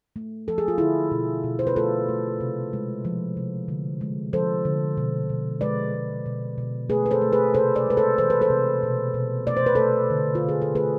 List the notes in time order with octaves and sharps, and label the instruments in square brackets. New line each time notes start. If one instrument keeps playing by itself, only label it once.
[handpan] A3
F3 A4
G#4
F4
D3 E4 G#4
B2
B2
C5
B4
A3 F4 A4
A3
C3
G#3
F3
C3
D3
G#3
F3 A4 C5
D3
B2
B2
G#3 B4 D5
G#3
B2
B2
A3 G#4 B4
B4
A4 C5
A3
G#4 B4
C3 A4 C5
B4 D5
G#3 B4
A4 C5
E3 C5
B4
A4 C5
C3
B2
B2
A3 D5
C5
B4
A3 A4 C5
D3
F4
D3
G#4
A4
A3 G#4 B4